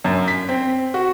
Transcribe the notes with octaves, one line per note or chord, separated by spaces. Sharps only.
F#2
B6
C4
F#4